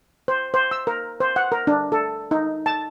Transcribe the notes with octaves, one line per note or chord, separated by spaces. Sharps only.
C5
C5
E6
A#4
C5
F#5
A#4
D4
A4
D#4
A5